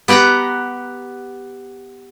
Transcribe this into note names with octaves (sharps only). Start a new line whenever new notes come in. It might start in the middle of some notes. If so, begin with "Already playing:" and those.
B3 G4 F#5 G5 A#5